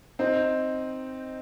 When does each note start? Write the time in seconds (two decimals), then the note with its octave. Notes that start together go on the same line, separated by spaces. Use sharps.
0.19 C4 D#4